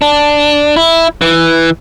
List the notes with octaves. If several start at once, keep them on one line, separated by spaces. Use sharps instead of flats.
D4
E4
E3